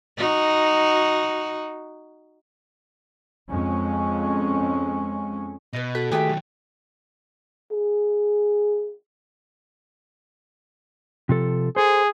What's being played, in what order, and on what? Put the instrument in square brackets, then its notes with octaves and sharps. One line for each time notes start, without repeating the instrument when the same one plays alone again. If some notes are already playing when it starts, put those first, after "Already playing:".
[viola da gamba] D#4 F#4
[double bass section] F2 G#3 C#4
[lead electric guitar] B2 [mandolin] B4 D#5
[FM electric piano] F#4 A4 B6 [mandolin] F#6
[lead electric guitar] D#3 [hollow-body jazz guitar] A3 G4 G#4 [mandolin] B4 G5 A5
[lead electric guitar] D#3 F#3
[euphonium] G#4
[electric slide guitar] C3 F3 A4
[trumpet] G#4 [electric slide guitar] A4 C5